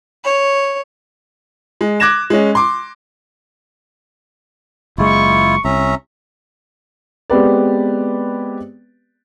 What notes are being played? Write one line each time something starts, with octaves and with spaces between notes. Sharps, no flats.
C#5
G#3
D6 F#6 G#6 A#6 E7
G#3 C#4
C6 D6
F#1 G#3 E4 F4 C#6
C2 C#4 E5 A#5
G#3 B3 C4 G4 B4 D5